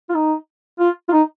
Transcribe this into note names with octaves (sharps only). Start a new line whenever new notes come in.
F4
D#4
F4
F4
D#4